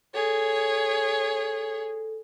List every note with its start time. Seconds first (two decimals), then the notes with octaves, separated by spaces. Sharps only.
0.14 G#4 A4 C#5